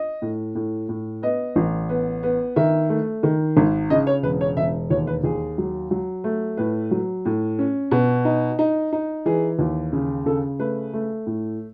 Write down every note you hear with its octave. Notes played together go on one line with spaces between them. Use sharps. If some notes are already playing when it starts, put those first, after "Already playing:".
Already playing: D#5
A2
A2
A2
B3 D#5
A1
B3
B3
D#3 E5
A3
D#3
G#1
C#3 D#5
C#5
E1 B4
C#5
E1 E5
D#2 C#5
B4
D#2 G#4
F#3
F#3
A3
A2 B4
F#3
A2
C#4
B2
D#4
D#4
D#4
E3 G#4
D#2
C#3
C#3 A4
A3 B4
A3
A2